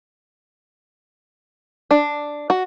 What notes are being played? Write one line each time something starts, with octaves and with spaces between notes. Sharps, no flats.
D4
F#4